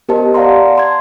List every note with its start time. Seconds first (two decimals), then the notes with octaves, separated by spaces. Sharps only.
0.09 B3 G4 A#4 C5 D#5 A5
0.34 D5 F5 F#5 A#5 C6
0.76 A5 C6 G#6